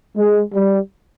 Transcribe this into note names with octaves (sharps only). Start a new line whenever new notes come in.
G#3
G3